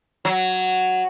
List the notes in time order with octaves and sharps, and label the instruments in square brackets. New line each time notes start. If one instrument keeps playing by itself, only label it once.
[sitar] F#3